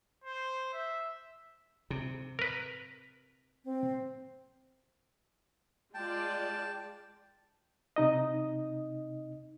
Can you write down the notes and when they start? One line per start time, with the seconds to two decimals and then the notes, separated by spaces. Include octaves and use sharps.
0.24 C5
0.73 E5
1.90 C3
2.39 A#4 B4
3.65 C4
5.94 G#3 F4 D5 G5 A5
7.96 C3 D#4 D#5